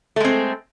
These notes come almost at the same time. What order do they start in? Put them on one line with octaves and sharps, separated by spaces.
A3 G#3 C4